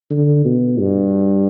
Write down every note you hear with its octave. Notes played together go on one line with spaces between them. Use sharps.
D3
B2
G2